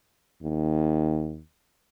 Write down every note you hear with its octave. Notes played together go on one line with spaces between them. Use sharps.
D#2